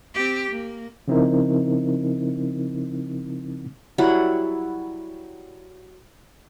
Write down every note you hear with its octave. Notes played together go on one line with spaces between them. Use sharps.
C4 G4
A#3
C#3 F3 C4 D#4 E4 A#4
F#3 G3 E4 F#5